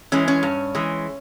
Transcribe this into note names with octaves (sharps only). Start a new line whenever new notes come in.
E3 G#3 C#4
C#4
G2
E3 G#3